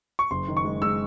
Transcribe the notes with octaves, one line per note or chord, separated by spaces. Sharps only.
C#6
F#1 C6
D#3
C#6
G#3
G#3 E6